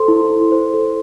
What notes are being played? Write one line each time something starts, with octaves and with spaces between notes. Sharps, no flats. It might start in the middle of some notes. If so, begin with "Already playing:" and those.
Already playing: A4 C5 C6
E4
E4
C5
A4